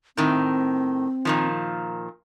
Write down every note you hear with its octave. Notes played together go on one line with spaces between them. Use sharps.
A2 D#3 C4
A#2 D#3 F3